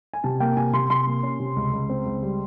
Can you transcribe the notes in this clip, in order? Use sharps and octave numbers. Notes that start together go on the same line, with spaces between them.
G#5
C3 A5
A#3 G5
C3 G#5
C3 C6
C3 C6
A#3
C#4
C3
C#2
C#2
C4
C#2
G3